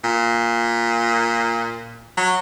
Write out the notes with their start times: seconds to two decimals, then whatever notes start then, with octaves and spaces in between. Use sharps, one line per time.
0.04 A#2
2.17 F#3